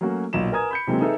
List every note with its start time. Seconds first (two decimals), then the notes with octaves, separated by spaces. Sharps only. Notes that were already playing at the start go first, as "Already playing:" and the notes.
0.01 F#3 A3 A#3 C#4 F#4
0.33 B1 A#2 A#3 E7
0.52 A#4 B4 G#5 A#5 D#6 G#6
0.71 B5 G6 C#7
0.87 C3 E3 F#3 G#3 A#3 C4
1.01 D#4 G#4 A4 B4 E5